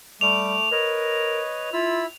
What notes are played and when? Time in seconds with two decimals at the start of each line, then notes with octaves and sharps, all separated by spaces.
0.21 G3 A3 D6 F7
0.72 A#4 B4 C#5 D#5
1.73 E4 F4 B5 E6